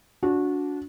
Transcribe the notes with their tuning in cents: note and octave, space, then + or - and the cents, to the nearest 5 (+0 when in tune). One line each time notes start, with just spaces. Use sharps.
D4 -25 F#4 -20